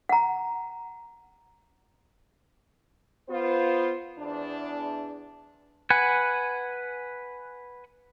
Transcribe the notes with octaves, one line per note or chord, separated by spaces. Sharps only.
F#5 A#5
B3 F4 C5
E2 D4
B4 F#5 G#5